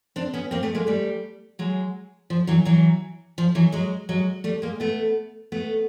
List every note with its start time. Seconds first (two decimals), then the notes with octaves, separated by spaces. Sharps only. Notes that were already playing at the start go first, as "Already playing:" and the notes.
0.16 C4 D4
0.33 B3 C#4
0.51 A#3 C4
0.63 A3 B3
0.75 G#3 A#3
0.87 G3 A3
1.59 F#3 G#3
2.30 F3
2.47 E3 F#3
2.65 E3 F#3
3.38 F3
3.55 E3 F#3
3.72 F#3 G#3
4.09 F#3 G#3
4.44 G3 A3
4.62 G#3 A#3
4.80 A3 B3
5.52 A3 B3